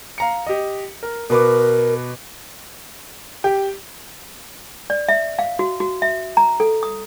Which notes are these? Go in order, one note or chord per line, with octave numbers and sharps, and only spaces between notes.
F5 A#5 C#7
G4 D#5
A#4
B2 A#4 B4 D6
G4
D5
E5
F5
F#4
F#4
E5
A#5
A4
D#6